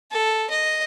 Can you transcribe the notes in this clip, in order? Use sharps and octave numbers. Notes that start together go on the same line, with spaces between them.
A4
D#5